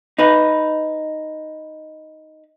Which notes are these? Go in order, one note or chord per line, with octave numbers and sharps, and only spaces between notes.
D#4 B4